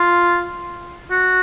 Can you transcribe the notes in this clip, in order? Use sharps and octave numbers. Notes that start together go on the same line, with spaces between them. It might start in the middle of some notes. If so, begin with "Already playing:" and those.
Already playing: F4
F#4